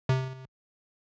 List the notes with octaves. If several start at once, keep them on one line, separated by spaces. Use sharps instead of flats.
C3